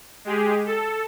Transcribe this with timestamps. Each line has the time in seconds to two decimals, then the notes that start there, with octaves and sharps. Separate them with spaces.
0.25 G#3 G4 G#4
0.66 A4